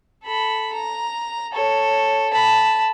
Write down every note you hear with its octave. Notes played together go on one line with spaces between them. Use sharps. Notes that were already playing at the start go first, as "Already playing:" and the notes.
A4 B5
A#5
A4 C#5
A5 B5